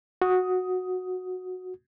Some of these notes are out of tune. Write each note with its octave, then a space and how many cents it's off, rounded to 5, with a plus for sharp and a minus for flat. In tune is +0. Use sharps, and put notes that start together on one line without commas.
F#4 -10 D#6 +10